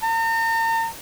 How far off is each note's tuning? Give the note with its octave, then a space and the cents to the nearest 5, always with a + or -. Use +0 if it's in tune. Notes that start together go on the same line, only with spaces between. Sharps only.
A#5 -45